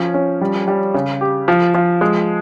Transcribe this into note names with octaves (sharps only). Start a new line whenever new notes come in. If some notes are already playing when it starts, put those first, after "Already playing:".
Already playing: F3 C#4
C#4
G3
G3
C#3
G4
F3
F3
G#3